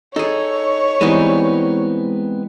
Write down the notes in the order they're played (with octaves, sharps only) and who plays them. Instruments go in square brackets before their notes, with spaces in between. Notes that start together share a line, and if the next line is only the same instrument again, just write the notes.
[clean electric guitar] D#4 [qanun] G#4 A4 [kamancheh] C#5
[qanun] E3 G3 D#4 [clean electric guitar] G#3 B3 C4